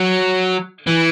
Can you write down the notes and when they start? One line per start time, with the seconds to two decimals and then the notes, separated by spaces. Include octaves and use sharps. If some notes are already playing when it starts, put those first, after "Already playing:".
Already playing: F#3
0.87 E3